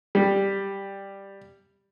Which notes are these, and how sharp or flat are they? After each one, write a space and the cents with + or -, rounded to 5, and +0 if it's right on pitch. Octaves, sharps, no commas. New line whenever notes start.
G3 +5